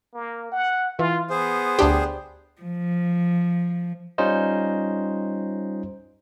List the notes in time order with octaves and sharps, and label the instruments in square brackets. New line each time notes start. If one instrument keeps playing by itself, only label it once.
[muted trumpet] A#3
F#5
[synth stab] E3 [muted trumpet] F4
[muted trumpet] B3 [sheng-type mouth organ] G#4 C5
[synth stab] D2 D4 G4
[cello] F3
[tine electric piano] G3 C#4 D#4 F4 C5 D#5